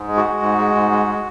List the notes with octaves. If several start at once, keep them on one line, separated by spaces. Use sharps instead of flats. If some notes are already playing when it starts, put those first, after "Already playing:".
Already playing: G#2
G#3
F#4
G#3
G#2
G#3
G#2
G#3
G#3